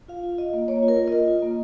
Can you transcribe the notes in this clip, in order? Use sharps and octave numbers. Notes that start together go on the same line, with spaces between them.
F4 F5
F4
F4 D#5
A#3
A#3 C#5
F4
A#4
F4
F4 D#5
F4
A#3